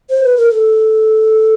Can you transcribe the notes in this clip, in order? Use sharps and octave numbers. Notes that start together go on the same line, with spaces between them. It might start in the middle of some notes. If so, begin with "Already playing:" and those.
C5
B4
A#4
A4